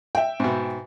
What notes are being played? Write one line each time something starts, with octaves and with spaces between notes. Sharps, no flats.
E5 G5
G#2 B2